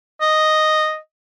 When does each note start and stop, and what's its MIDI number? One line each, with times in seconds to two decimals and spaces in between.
0.21 0.97 75